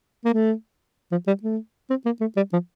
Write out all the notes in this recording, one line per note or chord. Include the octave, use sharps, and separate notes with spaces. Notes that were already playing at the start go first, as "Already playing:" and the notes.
A#3
A3
F3
G3
A3
C4
A#3
A3
G3
F3